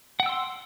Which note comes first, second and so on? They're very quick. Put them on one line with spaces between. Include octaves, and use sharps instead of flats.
F#5 G5 E6 C6